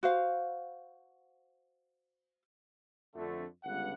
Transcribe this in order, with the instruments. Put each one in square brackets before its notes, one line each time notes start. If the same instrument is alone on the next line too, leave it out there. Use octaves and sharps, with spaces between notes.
[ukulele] F#4 C5 F5
[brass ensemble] F2 D3 A3
G1 C#2 G2 F#5